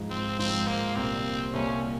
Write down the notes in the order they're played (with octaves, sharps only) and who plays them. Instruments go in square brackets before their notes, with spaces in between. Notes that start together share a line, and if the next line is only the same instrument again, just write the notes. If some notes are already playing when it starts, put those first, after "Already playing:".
Already playing: [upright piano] G#2 F3 G#3
[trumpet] C4
[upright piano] G#2 F3 G#3 [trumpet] C4
[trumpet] A#3
[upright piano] C2 A#2 G3 A#3 [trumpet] C4
[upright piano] C2 A#2 G3 A#3 [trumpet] C#4